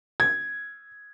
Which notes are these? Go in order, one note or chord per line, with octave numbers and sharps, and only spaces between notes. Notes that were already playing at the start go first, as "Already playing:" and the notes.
G#6